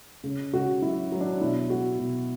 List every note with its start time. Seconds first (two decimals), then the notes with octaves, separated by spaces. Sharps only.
0.24 C#3
0.53 C#3 F#4
0.82 F#3 E4
1.12 F#3
1.21 D4
1.41 B2 E4
1.70 F#3 F#4
1.99 B2